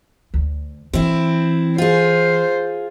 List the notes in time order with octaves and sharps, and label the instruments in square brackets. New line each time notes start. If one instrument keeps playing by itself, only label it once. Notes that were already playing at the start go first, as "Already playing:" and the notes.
[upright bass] D2
[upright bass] E3 [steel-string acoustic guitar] C4 E4
[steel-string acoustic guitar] F4 G#4 [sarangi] C5